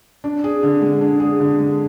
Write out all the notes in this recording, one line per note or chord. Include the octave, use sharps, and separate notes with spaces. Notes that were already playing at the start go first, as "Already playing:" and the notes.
D4
G#4
D3
G#3
D4
G#4
D3
G#3